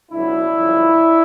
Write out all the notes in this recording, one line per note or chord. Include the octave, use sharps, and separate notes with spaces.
C#2 B2 F#3 D4 E4
G1 F#2 C#3 F3